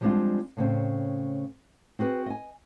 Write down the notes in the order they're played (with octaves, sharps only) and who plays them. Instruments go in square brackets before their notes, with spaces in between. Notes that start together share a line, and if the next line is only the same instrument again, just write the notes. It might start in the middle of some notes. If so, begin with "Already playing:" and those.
[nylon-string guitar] F3 G3 G#3 C4 D4 F4
A2 C#3 C4
C4 F#4 G#4 B4
D#5 G#5